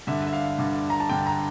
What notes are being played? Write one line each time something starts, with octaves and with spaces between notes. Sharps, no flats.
G2 D3 E5
E5
F5
G2 D3
A#5
A5
G2 D3 G5
A#5